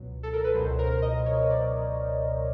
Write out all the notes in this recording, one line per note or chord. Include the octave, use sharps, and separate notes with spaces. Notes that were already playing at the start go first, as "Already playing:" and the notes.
Already playing: C#2 B2 F#3
A4
A#4
B4
C#2 B2 F#3 C5
A#4
D#5
C#5
D5